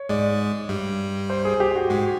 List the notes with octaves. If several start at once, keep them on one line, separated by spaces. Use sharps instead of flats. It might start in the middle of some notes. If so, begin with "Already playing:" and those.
Already playing: C#5
G#2 G#3 D5
G2 G3
C5
G#4
G4
F#4
G#2 G#3